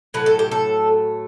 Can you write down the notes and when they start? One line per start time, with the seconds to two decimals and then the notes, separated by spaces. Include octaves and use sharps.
0.14 A2 F#3 A3 B4
0.26 A4
0.39 G4
0.51 A4